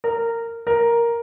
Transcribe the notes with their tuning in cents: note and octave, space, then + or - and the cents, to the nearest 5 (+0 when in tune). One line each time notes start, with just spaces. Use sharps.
A#4 -15
A#4 +5